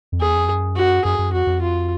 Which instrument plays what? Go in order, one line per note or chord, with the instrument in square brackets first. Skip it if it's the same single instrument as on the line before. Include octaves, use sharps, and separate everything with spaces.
[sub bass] F2
[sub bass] E2 [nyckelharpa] G#4
[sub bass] F2
F#2
[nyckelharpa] F#4
[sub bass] F#2 [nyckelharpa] G#4
[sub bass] F#2
[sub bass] F2 [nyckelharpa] F#4
[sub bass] F2
[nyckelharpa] F4